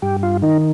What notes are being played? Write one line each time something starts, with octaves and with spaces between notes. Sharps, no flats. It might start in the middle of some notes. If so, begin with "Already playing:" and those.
G2 G4
F4
D#3 D#4